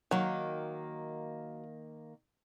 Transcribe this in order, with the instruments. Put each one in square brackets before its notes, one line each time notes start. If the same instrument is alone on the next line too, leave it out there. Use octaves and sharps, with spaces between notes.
[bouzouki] D#3 A#3 [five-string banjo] F#3